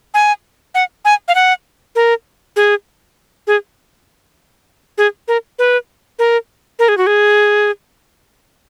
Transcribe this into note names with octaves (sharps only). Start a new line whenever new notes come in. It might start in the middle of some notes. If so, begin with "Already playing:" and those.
G#5
F#5
G#5
F5
F#5
A#4
G#4
G#4
G#4
A#4
B4
A#4
A#4
G#4
F#4
G#4